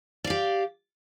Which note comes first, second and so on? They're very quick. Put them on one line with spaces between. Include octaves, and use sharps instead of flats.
D5 F5 G4